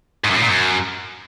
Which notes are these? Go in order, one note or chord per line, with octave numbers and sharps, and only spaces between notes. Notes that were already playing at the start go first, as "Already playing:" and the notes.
G#2
F#2
A2
A#2
F#2